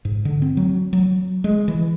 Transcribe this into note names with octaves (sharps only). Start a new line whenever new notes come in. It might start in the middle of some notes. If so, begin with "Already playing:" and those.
G#2
D3
C4
F#3
F#3
G#3
E3